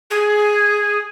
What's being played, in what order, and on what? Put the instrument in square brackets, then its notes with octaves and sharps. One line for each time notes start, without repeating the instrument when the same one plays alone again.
[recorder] G#4